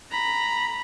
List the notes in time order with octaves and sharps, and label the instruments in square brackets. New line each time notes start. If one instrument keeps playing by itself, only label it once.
[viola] A#5 B5